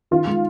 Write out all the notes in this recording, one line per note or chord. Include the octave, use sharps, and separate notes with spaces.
D#3 F4
G#3